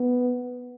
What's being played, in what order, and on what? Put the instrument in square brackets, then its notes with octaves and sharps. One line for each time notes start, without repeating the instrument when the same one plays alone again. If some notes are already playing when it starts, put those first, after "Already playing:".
Already playing: [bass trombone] B3